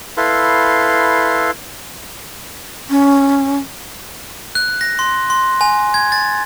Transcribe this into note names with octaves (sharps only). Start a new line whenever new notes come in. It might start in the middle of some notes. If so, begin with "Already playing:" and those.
E4 A4 B4 F5 C6
C#4
F#6
A#6
C6
C6
G#5
G#6
A6